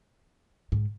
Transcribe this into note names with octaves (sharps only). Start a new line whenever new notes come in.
G#2